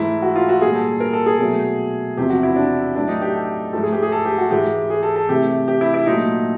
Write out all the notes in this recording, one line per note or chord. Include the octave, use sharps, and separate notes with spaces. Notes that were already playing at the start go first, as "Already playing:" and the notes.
Already playing: G#2 E3 A3 E4
F#4
F4
F#4
A#2 G3 G#4
A4
A#4
A4
G#4
B2 F#3 A3
E2 C3 F3 G4
F#4
E4
D4
A2 F#3 A3 D4
D#4
G4
A4
G#2 F3 A3 A4
G#4
G4
G#4
A4
G4
F#4
G#2 E3 G#3 G4
G#4
A4
A4
C3 E3 A3 G4
G4
E4
E4
A#2 F#3 A3 D#4